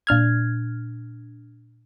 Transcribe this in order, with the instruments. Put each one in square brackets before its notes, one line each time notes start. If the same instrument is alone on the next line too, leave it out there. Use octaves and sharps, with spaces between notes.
[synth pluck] A#2 D4 F6 G#6